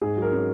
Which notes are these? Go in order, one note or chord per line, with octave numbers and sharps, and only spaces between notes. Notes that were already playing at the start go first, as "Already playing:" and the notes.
G#2 G#4
F#3
A#4
C#4